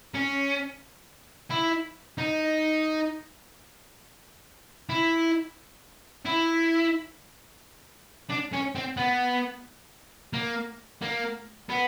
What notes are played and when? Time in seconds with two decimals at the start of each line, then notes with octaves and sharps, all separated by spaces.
0.14 C#4
1.51 E4
2.18 D#4
4.89 E4
6.26 E4
8.29 D4
8.53 C#4
8.75 C4
8.97 B3
10.33 A#3
11.02 A#3
11.69 B3